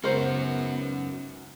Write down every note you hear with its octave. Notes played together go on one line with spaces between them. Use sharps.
C#2 G#2 B3 C#4 F#4 A#4 C5